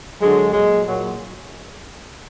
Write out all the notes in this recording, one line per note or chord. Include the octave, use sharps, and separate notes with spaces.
D3 F#3 G#3
A#2 F#3 G#3
A#2 F#3